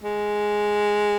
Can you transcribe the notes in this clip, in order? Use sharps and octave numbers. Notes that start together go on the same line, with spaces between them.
G#3